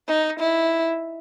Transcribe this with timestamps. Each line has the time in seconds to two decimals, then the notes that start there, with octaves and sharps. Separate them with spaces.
0.08 D#4
0.40 E4